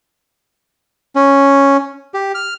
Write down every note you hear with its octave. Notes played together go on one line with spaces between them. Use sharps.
C#4
G4
F6